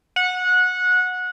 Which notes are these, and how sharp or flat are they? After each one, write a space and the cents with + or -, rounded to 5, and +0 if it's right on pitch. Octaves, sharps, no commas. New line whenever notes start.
F#5 -20